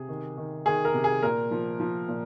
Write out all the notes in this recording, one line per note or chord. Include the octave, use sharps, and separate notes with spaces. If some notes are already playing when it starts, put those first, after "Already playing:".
Already playing: C3 G#4
D#3
D#3
D#3 G#4
A#4
C3
G#4
A#2 A#4
F3
F3
A#2